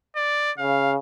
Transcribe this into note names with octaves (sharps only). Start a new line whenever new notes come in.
D5
C#3 F5